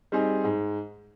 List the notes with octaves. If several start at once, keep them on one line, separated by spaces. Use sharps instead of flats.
G3 C4 D#4 G#4
G#2